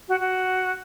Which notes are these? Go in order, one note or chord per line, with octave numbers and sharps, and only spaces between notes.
F#4
F#4